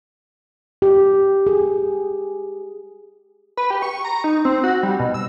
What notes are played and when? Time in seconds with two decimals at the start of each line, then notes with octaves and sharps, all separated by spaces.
0.82 G4
1.47 G#4
3.57 B4
3.70 G4
3.82 C#6
4.05 A#5
4.24 D#4
4.45 C4
4.64 F#4
4.83 G3
4.99 B2
5.14 E6